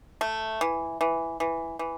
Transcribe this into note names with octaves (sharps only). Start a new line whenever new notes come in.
A3
E3
E3
E3
E3